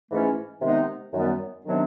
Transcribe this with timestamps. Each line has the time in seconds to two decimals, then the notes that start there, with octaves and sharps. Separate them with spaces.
0.10 G#2 E3 A3 C#4 E4
0.61 C3 D#3 G#3 B3 D#4
1.13 F#2 D#3 G3 B3
1.64 C3 D#3 F#3 B3 D4